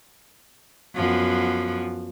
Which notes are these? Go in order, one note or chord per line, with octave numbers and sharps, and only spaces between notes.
F#2 F3 B3